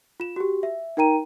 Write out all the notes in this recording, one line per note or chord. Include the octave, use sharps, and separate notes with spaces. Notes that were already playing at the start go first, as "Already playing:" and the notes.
F4 E7
F#4 G4
E5
D#4 A#4 G5 A#5 D#7